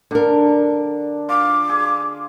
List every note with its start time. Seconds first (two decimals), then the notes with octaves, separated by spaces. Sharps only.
0.11 D3 D4 A4 A#4
1.29 F4 D6
1.69 G#4